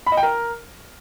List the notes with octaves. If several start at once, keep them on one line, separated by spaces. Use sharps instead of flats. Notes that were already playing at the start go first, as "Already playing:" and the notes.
B5
D#5
G5
A#4